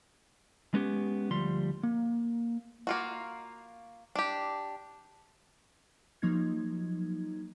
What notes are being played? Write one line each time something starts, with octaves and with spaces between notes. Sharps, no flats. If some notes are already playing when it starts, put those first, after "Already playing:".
G#3 B3 C#4 G4
D2 F3 G3 C6
A#3
A#3 F4 F#4
D4 G4
F3 F#3 A#3 D#4 G#6